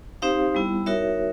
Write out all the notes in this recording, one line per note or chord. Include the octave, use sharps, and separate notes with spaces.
C4 D#4 G4 C5 F5
G3 B3 E4
D#4 F#4 A#4 C#5 E5